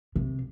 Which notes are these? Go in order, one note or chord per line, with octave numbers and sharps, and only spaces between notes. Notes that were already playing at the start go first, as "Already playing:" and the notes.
C3